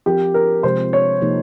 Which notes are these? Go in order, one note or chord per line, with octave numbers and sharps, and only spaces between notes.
F3 C4 F4 G4 A#4
A#4
C3 F3 G#3 C4 G4 C5
C#5
C3 F3 A#3 D#4 G4